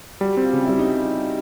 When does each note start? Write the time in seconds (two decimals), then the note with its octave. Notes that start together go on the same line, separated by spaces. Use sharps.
0.21 G3 F#4
0.37 C4 F4
0.53 C#3
0.64 G3 E4
0.79 D#4